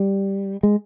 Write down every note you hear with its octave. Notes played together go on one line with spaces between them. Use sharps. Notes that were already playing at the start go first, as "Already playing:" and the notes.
Already playing: G3
G#3